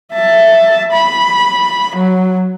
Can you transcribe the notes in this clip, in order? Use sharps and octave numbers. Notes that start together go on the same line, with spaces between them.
E5 A5
B5
F#3